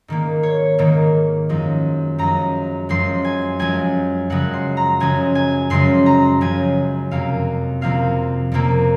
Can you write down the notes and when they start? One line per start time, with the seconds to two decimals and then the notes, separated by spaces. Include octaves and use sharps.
0.08 G#2 D#3 A#3
0.43 C#5
0.78 G#2 D#3 A#3
1.49 F#2 F3 G#3
2.18 F#2 F3 G#3 A#5
2.89 F#2 F3 G#3 C6
3.24 G#5
3.59 F#2 F3 G#3 G#5
4.30 F#2 C#3 F3 G#3 F#5
4.53 C6
4.77 A#5
5.00 F#2 C#3 F3 G#3 G#5
5.35 G#5
5.70 F#2 C#3 F3 G#3 C6
6.06 A#5
6.41 F#2 C#3 F3 G#3 G#5
7.11 F2 C3 F3 A#3 F5
7.81 F2 C3 F3 A#3 F5
8.52 F2 C3 F3 A#3